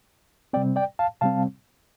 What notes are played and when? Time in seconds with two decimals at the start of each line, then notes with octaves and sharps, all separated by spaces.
0.53 C3 G3 C4 D5 G5
0.76 D5 G5
0.99 F5 A5
1.21 C3 G3 C4 F5 A5